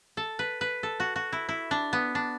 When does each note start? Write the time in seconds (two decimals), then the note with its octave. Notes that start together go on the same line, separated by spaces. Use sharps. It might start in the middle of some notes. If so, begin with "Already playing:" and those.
0.17 A4
0.39 B4
0.61 B4
0.83 A4
1.00 F#4
1.16 F#4
1.33 E4
1.49 E4
1.71 D4
1.93 B3
2.15 D4